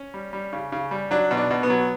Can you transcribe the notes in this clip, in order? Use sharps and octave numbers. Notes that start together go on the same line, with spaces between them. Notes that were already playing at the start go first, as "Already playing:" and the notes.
Already playing: C#4
G3
G3
C#3
C#3
G3
F#3 D4
B2
D4
B2
B3
F#3